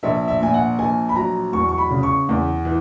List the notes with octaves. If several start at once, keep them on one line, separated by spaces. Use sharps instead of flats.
A#1 E5
E5
A#2 G#5
F#5
A#1 G#5
B5
F#3 A#5
E2 C#6
C#6
B5
C#3
C#6
E2
E3